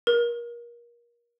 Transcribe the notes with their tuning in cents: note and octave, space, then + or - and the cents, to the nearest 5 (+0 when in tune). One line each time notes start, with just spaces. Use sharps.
A#4 +30